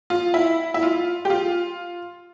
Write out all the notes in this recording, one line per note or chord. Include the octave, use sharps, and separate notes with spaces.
F4
E4
E4
F4
G4
F4